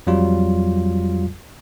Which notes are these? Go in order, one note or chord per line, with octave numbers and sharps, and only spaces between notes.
F2 F#3 G3 F4